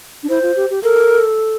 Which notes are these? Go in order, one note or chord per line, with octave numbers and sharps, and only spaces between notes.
D4
E4 C5
F4
G4
G4
A4 A#4